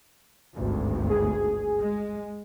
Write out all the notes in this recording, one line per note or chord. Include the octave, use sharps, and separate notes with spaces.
G#1 D2 G2
G#4
G#3